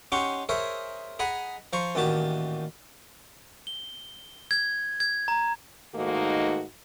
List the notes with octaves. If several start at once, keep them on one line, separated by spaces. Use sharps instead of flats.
C#4 D#4 G4 F#5 C6 C#6
G#4 A#4 C5 C#5 D#5 E5
G#4 D#5 F#5 G#5 A#5 B5
F3 C5 A#5 C#6
A1 A#2 D#3 F#4 G4 A5
G7
G#6
G#6
A#5
G#2 D#3 A3 A#3 D#4 F#4